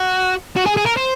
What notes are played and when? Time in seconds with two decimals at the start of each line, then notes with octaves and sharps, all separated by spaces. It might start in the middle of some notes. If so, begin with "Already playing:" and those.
Already playing: F#4
0.56 F#4
0.66 G#4
0.77 G#4
0.86 A#4
0.97 C5